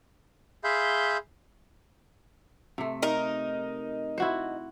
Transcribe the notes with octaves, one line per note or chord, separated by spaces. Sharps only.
G#4 E5 F5 B5 C6 G6
C3 A3
D#4 A#4
E4 F#4 C5